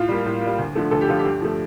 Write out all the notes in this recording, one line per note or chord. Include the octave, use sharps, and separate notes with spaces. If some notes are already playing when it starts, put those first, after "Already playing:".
Already playing: A2 F4
G3 A#3
A2
G3 A#3
D2
D3 F3 A3
D2 A4
G4
D3 F3 A3 F4
G4
G2
F3 A3